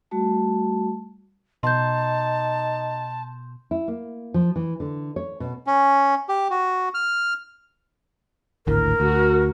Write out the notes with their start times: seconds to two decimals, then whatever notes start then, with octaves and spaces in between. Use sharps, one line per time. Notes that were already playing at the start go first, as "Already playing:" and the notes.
0.11 G3 A3 F#4 A5
1.63 B2 D#4 A5 C6 G6
3.71 E4
3.88 A#3
4.34 F3
4.56 E3
4.80 D3
5.16 C#5
5.40 B2
5.66 C#4
6.29 G4
6.50 F#4
6.94 F6
8.67 G#1 D2 A2 A#4
9.00 D2 F#4